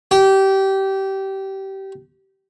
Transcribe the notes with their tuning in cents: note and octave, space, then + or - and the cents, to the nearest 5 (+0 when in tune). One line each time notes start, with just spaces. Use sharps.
G4 -20